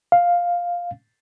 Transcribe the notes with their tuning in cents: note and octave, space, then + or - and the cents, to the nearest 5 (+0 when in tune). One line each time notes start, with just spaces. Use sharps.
F5 +5